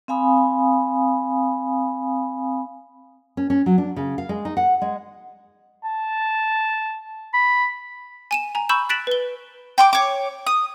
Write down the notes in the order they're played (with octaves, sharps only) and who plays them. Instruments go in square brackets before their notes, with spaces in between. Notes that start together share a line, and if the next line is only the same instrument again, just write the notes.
[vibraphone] C4 F5 G#5 B5 D#6
[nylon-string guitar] C#4
C#4
F#3
D4
C#3
F5
G#3
D#4
F#5
G#3
[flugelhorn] A5
[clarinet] B5
[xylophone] G#5 D#7 E7
G#5 A#5
B5 C#6 E6 G6 E7
F#6 A6 B6 D7 E7 F#7
B4 G7
[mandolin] G5 C6 D6
C#5 D6
D#6